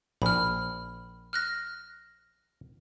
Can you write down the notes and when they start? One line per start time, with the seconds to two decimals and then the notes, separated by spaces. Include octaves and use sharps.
0.22 A#1 B5 F6
1.33 F6 F#6 A#6